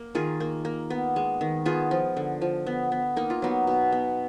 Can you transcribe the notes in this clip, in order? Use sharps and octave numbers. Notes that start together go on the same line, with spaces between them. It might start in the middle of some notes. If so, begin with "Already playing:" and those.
Already playing: A#3
D#3 F4 G#4
A#3
A#3
B3
G#3
D#3
B3 F4 G#4
F3
D3
F3
B3
B3
A#3 D#4
F4
F#3 B3 D#4
B2
B3